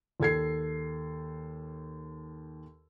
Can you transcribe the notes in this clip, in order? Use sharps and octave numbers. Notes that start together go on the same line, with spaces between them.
D#2 A4 G#6 C7